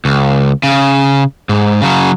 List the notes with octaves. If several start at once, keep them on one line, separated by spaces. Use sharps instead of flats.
C#2
C#3
G#2
C#3 F#3